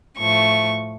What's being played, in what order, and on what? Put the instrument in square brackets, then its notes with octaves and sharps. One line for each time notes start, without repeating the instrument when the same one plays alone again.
[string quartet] A2 F3 A3 C#6